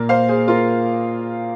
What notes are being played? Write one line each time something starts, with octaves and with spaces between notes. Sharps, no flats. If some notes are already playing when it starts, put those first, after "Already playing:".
Already playing: A#2 A#3
C5 F5
G#4 C5
F4 A#4